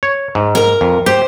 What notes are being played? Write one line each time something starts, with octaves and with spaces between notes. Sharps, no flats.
C#5
G#2
A#4 A#5
F2
G4 C5